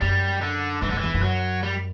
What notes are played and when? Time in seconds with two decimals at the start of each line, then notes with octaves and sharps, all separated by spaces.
0.01 F#2 G3
0.41 D3
0.82 G2 E3
0.90 D3
0.93 F#2
0.98 E3
1.04 E2
1.14 F#2
1.23 F#3
1.63 G3